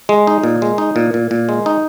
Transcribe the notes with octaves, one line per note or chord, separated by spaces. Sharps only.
G#3
D#4
A#2
G#3
D#4
A#2
A#2
A#2
G#3
D#4